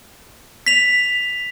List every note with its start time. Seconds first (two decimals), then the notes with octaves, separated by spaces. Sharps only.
0.66 B6 F7